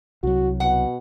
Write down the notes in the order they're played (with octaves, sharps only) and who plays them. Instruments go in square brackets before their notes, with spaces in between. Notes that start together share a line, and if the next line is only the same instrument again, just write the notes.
[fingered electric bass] C2 F#3 [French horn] F#4
[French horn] B2 [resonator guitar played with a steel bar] F#5